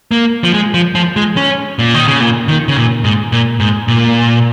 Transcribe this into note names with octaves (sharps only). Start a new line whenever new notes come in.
A#3
F3
G#3
F3
F3
G#3
C#4
A#2
D#3
C#3
A#2
D#3
C#3
A#2
G#2
A#2
G#2
A#2